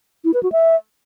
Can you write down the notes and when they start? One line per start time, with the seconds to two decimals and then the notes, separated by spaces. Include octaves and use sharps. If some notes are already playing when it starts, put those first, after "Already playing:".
0.24 E4
0.34 B4
0.43 F#4
0.52 E5